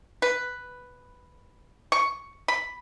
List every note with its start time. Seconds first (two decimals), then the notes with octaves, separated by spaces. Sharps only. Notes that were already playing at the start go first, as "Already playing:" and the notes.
0.22 B4
1.92 C#6
2.48 B5